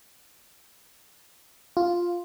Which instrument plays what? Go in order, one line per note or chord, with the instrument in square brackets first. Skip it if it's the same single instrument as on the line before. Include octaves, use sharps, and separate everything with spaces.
[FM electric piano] F4